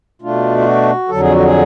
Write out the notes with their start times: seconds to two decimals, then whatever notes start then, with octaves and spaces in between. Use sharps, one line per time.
0.22 B2 A3 D4 F4
0.58 F4
0.65 F#4
1.09 F2 D3 F#3 A4
1.21 G#4
1.32 F#4
1.44 G#4